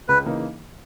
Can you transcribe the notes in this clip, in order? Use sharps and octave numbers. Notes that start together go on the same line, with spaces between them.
C#2 B4
C#3 E3 A#3 D#4